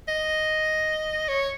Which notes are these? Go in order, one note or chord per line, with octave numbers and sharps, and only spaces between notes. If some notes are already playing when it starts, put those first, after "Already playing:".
D#5
C#5